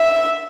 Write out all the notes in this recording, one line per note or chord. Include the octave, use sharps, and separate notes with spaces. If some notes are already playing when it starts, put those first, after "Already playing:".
Already playing: E5